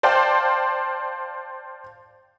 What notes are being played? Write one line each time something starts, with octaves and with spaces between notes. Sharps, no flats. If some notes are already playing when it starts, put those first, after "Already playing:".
C5 D5 F5 G5 A5